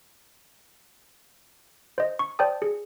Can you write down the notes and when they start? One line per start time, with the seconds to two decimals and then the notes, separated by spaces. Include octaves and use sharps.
1.98 C5 D#5
2.19 C#6
2.39 C5 D5 G5 A5 D#6
2.62 G#4